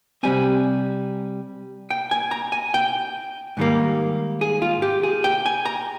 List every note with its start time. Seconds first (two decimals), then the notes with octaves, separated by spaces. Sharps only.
0.23 C3 G3 C4 G#5
1.90 G5
2.11 G#5
2.31 A#5
2.52 G#5
2.74 G5
3.57 G#2 D#3 G3 A#3
4.41 G#4
4.62 F4
4.82 G4
5.03 G#4
5.24 G5
5.46 G#5
5.65 A#5